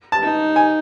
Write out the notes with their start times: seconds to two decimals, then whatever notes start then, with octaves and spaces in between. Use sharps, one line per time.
0.12 A5
0.23 D#4
0.56 G#5